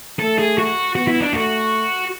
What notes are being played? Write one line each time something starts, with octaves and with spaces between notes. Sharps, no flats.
A3 A4
G#4
F#4
B3 F#4
E4
D4
A3 F#4